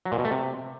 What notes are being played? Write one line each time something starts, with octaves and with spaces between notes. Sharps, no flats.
F#3
A#2
B2
A3
C3